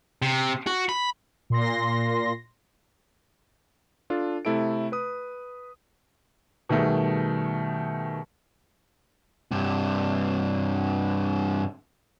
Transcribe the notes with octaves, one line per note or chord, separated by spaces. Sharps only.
C3
F#4
B5
A#2 C6 A#6
D4 F4 A4
C3 A3 E4 A4 D7
B4 D#6
B2 D#3 G3 A3 G#4
G2 C3